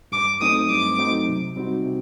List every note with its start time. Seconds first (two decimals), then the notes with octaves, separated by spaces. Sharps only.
0.12 G2 D6
0.41 F#3 A3 C4 D#4 D#6
0.70 G2 D6
0.98 F#3 A3 C4 D#4
1.28 C3
1.56 G3 C4 D#4 F#4
1.86 C3